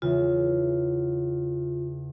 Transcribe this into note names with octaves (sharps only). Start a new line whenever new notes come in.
E2 C#3 F4